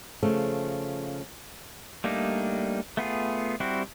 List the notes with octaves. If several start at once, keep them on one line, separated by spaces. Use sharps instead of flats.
C#3 F3 A3
G3 A3 A#3 D4 D#4
A3 B3 F4 G#4
G3 C4 E4 F#4